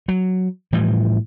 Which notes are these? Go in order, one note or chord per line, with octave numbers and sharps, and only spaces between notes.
F#3
A2 E3 F3 G3